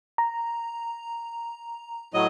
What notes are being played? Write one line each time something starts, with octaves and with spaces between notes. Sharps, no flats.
A#5
A2 F#3 D#5